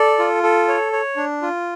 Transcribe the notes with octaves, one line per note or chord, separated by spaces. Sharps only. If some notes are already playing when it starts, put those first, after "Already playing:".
Already playing: A4 D5
F4
A4
C#5
C#5
D4
F4